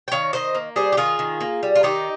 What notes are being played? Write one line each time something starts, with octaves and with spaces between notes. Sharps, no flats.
G5
D#3 C#5 F5
D#3 C5 D#5
A#3
G3 G#4 C5
G4
D#3 F4 G#4
D#3
A#3
G3
F4
D#3 D#4 G4